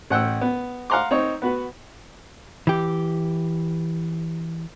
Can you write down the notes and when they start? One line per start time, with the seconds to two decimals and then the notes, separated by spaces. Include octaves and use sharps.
0.10 A1 F#5 G5 E6
0.41 B3
0.90 F5 F#5 A#5 C6 D6
1.11 C4 D#4 C#5
1.42 B3 F#4 B4
2.67 E3 G4